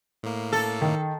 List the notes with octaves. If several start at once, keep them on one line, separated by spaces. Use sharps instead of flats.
A2 A#3
A4
D#3